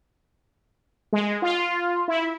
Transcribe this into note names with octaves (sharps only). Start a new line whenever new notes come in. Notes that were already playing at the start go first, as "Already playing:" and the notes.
G#3
F4
E4